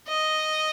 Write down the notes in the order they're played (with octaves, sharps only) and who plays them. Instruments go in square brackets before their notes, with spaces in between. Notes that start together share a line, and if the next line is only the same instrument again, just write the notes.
[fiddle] D#5